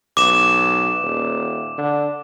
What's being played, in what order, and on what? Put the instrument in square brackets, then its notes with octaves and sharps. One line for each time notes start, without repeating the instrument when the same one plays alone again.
[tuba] B1 [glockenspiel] D6 E7
[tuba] D#1
D3